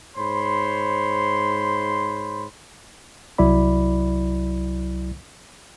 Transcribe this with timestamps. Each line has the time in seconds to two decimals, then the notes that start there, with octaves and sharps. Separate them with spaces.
0.17 G#2 C5 C#5 B5 C6
3.38 C2 F#3 E4 D5 B5